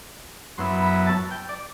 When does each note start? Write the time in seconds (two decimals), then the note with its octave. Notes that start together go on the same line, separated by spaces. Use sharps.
0.58 F#2 F#3 B3 E4 C6
0.82 B5
1.06 A5
1.31 G5
1.49 D5